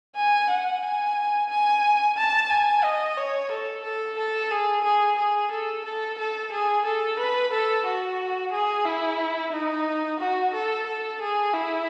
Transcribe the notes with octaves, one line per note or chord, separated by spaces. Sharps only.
G#5
F#5
G#5
G#5
A5
G#5
D#5
C#5
A4
A4
A4
G#4
G#4
G#4
A4
A4
A4
G#4
A4
B4
A4
F#4
G#4
E4
D#4
F#4
A4
A4
G#4
E4